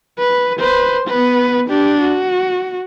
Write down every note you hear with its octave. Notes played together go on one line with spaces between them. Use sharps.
B4
B4 C5
B3 B4
D4 G4
F#4